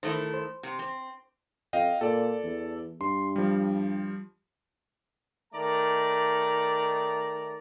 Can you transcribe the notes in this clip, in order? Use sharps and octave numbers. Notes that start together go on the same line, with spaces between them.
D#3 A3 E4 C5
C5
C3
C4
F2 D#5 F5 G5
A#2 A4 D5
E2
G2 C6
F3 G3
D#3 A3 D5 A#5